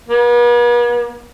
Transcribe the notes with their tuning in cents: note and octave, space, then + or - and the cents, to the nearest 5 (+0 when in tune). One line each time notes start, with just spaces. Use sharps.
B3 -45